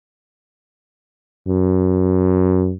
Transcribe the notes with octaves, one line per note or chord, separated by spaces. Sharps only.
F#2